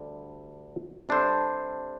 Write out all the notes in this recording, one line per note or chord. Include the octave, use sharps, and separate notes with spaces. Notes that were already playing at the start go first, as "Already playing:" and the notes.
Already playing: D2 D3 G3
C3 G3 D4 A4 C5